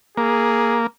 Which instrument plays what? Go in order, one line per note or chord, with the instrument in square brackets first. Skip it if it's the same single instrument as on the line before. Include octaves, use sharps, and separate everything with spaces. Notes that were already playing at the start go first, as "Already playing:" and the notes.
[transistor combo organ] A#3 [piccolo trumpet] G#4